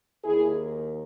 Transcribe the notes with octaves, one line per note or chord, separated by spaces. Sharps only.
D#2 D#3 E4 G#4